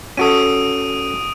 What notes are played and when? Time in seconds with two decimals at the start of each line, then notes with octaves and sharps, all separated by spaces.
0.17 C#4 F#4 A4 D#6 D7 D#7